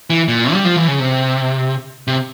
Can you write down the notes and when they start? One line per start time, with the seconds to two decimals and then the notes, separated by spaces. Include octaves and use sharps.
0.10 E3
0.28 A#2
0.53 G3
0.65 F3
0.77 E3
0.88 C#3
1.00 C3
2.07 C3